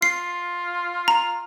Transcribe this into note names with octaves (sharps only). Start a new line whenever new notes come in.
F4 C7
A#5